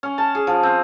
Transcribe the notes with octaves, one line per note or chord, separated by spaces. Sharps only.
C#4
A5
G#4
F3
C4